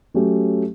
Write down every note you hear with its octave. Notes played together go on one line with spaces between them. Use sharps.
F#3 A3 C#4 G4